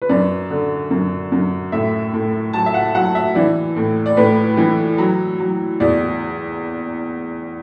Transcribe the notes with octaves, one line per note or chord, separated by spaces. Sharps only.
B4
F#2 D5
D3
F#2
F#2
A2 E5
A2
F#3 A5
E5
F#5
F#3 F#5
E5
E3 D5
A2
D5
A2 B4
E3
F#3
F#3
E2 D5